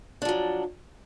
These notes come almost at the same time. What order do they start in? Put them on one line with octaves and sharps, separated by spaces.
D4 F3 F#3